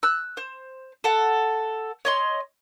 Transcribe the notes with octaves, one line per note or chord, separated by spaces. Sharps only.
E6 F#6
C5
A4 F#5
C#5 D#5 C6